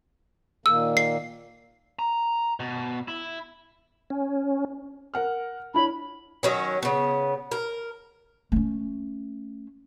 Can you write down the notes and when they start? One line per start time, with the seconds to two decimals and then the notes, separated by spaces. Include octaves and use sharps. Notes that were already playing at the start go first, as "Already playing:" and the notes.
0.66 A#2 D#3 A#3 E6
0.97 C7
1.99 A#5
2.60 B2
3.08 E4
4.10 C#4
5.14 A#4 F#5 F6
5.74 D4 E4 C#5 B5
6.43 D#3 F#3 C#4
6.83 C#3 B3
7.51 A#4
8.52 A3 C#4